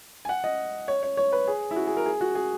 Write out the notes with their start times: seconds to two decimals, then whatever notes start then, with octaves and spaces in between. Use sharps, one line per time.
0.25 G#5
0.29 F#5
0.44 D#5
0.88 C#5
1.03 C#5
1.17 C#5
1.33 B4
1.47 G#4
1.71 E4
1.76 F#4
1.87 G#4
1.97 A#4
2.06 G#4
2.21 F#4
2.35 G#4